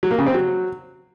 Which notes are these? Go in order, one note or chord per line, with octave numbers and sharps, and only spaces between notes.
F#3
A#3
C#3
C4
F#3